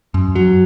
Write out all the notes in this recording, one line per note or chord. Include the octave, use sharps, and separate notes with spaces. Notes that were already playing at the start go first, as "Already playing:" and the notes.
F#2
F#3